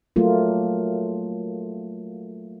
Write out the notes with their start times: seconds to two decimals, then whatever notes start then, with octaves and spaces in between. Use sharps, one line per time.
0.16 F#3 A3 A#3 F4